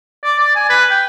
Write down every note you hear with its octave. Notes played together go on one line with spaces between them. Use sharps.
D5
D5
G#5
B4
G5